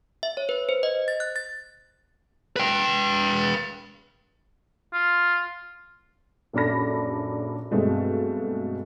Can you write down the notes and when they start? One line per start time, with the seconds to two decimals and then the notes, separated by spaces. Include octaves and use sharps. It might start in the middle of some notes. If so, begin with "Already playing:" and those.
0.23 E5
0.37 C#5
0.49 B4
0.69 C5
0.83 D#5
1.08 A6
1.20 F#6
1.36 A6
2.56 B4 G5
4.94 F4
6.53 A#1 F#2 D4 A4 B5 A#6
7.71 G2 B2 G#3 A3 C4